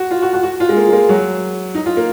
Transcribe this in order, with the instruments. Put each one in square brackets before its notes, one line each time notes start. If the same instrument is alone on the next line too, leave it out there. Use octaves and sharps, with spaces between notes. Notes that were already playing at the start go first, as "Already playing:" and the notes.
Already playing: [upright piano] F#4
F4
F#4
F#4
F#4
F4
G#3
A#3
G#3
A#3
F#3
D#4
F4
A#3